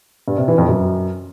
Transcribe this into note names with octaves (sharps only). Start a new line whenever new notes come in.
G2
C3
E3
F2
F#2